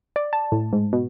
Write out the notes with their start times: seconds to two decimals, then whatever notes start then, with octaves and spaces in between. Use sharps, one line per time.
0.16 D5
0.33 A5
0.52 A2
0.73 G#2
0.93 B2